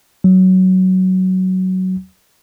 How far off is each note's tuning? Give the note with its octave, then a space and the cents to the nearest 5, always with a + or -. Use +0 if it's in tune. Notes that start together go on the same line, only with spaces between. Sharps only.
F#3 +10